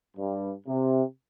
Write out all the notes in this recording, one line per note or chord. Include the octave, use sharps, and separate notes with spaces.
G2
C3